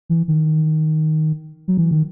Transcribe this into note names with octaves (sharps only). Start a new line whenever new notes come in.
E3
D#3
F#3
E3
D#3